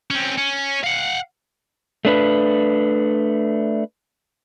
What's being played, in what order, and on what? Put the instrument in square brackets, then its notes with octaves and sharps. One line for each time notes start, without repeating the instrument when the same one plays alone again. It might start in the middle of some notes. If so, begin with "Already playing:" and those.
[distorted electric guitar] C4 C#4
C#4
F5 F#5
[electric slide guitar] A3 D4 B4